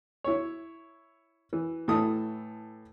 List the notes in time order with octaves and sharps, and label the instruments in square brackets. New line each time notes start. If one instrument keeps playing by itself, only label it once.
[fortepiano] E4 C#5
E3
A2 E3 A4 D#6